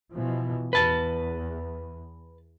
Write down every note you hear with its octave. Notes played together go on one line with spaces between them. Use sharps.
B2 E3 F3
E2 B4 A5